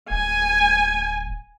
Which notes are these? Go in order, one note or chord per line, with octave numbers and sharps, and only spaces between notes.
D1 G#5